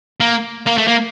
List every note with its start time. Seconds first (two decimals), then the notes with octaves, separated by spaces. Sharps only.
0.20 A#3
0.66 A#3
0.77 A3
0.87 A#3